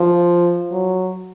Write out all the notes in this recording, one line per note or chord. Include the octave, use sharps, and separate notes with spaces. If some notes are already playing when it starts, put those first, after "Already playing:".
Already playing: F3
F#3